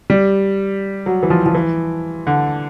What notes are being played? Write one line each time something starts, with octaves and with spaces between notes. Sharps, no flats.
G3
F#3
E3
F3
F3
E3
D3